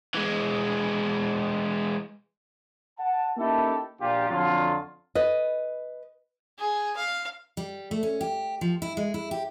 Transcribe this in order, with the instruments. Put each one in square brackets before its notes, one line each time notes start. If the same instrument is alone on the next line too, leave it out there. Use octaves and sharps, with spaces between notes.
[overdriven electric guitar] E3 G#3
[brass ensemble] F#5 A5
A#3 C#4 D#4 E4 G4 A4
A#1 A#2 F4 G4
F2 D3 F#3 F4
[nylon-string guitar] B4 D#5
[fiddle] G#4
F5
[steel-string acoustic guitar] G3
A3
C#4
G4
F3
E4
G#3
E4
G4